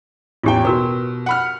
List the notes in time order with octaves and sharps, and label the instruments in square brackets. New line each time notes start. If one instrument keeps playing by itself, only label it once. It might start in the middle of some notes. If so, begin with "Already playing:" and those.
[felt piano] A1 E2 G5 [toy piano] F4 G4
[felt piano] B2 [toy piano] F#4 A#4 B4
[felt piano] F#5 B5 F6